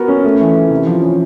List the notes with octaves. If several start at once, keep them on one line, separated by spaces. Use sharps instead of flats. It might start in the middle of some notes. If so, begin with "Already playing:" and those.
Already playing: B3 F#4 A#4
C#4
A3
E3
E3
C3
F3
C#4